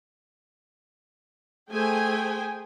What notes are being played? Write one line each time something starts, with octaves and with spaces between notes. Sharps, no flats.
A3 G#4 C5 G5 G#5